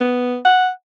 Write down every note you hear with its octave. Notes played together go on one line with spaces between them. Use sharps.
B3
F#5